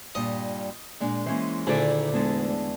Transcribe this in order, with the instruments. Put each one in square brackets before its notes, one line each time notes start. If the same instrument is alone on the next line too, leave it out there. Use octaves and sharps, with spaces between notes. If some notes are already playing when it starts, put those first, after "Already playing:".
[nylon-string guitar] G2 A#2 G3 [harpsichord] D#5
[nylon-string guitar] A#2 G#3 D4
[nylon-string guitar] E3 G#3 A#3 [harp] C#4 C5
[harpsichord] D2 A#2 [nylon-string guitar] D#3 G#4 [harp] E4 D5 E5
[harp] E2 G#3 A5 [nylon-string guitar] D3 A3